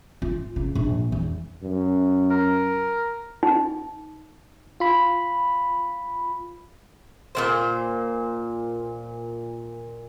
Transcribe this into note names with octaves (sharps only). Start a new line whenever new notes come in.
F4
C#3
A#1
E2
F#2
A#4
D#4
F4 B5
A#2 D#3 C5